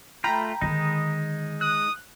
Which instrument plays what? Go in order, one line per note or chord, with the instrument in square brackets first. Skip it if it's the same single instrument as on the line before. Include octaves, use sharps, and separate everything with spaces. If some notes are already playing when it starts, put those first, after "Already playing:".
[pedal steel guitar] A3 F4 [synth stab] G5 A#5 B5
[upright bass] D3 D#3 [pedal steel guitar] G#3 D#4
[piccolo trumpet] D#6 [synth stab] F#6